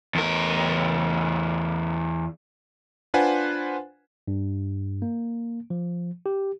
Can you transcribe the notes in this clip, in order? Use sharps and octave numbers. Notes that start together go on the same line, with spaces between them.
E2 A#4
D4 F4 B4 C5 F#5 G#5
G2
A#3
F3
G4